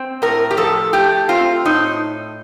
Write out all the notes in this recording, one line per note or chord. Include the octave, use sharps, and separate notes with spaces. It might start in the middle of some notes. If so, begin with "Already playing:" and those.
Already playing: C4
A2 A#4
G4
F3 A4
A3 G4
C4 F4
A2 D#4